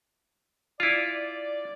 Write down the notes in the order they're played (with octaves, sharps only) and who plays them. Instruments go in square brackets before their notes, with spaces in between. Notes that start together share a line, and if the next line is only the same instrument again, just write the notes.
[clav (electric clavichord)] E4 F4 [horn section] D5